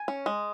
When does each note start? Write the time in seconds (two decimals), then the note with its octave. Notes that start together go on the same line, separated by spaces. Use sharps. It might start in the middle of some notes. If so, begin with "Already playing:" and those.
Already playing: G#5
0.08 C#4
0.26 G#3